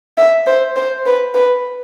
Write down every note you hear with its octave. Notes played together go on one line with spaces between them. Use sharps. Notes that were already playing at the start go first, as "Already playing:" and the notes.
E5
C5
C5
B4
B4